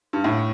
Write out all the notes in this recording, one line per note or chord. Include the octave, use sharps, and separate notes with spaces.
G2
A2